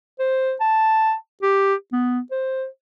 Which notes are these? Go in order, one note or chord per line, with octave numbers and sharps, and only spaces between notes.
C5
A5
G4
B3
C5